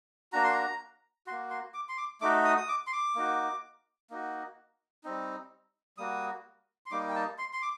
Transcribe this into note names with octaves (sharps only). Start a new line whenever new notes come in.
A#3 D4 F#4 A#5
C6
A#5
A#3 F#4 C6
C6
D6
C6
D6
A3 D#4 F#4 D6
D#6
D#6
D6
C6
D6
A#3 D#4 F#4
A#3 D#4 F#4
G3 C4 D#4
G3 A#3 F#4 D#6
C6
G3 A#3 D#4 D6
G5
A5
C6
C6
D6